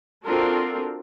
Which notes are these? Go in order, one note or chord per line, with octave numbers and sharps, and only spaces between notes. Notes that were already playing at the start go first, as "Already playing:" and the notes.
C4 D4 F4 F#4 A4 A#4